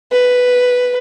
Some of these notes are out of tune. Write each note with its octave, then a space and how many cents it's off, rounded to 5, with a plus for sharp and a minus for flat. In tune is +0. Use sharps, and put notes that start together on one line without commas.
B4 +0